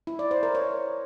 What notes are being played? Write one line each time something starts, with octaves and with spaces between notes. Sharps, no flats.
E4
D5
C5
A#4
C#5